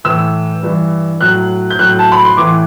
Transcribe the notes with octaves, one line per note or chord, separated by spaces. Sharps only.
A2 E3 E6
G2 E3
A2 F#3 F#6
G6
A2 F#3 F#6
A5
B5
C6
A2 E3 D6